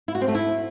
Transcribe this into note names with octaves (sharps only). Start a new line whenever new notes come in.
E4
F#4
C4
A3
E4